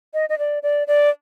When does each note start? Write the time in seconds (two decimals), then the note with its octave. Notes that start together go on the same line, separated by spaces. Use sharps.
0.14 D#5
0.29 D#5
0.39 D5
0.63 D5
0.87 D5